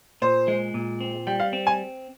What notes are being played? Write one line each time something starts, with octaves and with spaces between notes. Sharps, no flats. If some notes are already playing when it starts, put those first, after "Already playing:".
A#2 C5
G#3
A#2
C4
G3 G5
F5
C4
G#5